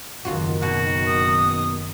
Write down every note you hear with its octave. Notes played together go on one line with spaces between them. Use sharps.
F#1 D#2 D#3 F4 F#4
B2 F#4
D#6